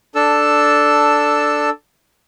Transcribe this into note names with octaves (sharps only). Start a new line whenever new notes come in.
D4 A4 A5 E6